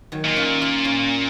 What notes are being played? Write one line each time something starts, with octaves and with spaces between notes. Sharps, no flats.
D#3 F#3
A#2
C#4 F4
F4
C#4 F4